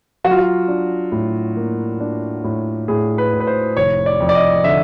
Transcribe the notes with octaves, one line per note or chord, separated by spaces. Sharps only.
F#3 F#4
F4
F#4
D4
A2
A#3
D4
A2
A2 G#4
B4
A2
B4
C5
F1 C#5
D5
F2
D5
D#5
D3 E5